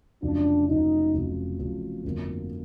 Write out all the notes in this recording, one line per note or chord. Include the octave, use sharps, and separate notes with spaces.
F1 F2 C#3 F#3 D4
F1 F2 C#3 F#3 D#4
F1 F2 C#3 F#3
F1 F2 C#3 F#3
G1 F2 D3 F#3 A#3